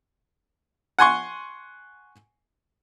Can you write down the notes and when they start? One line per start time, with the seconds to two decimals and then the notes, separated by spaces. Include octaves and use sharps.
0.99 F#5 G#5 C6 C#6